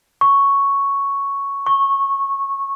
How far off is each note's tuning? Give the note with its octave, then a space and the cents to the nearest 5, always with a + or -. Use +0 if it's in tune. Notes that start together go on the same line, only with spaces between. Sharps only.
C#6 +0
C#6 -15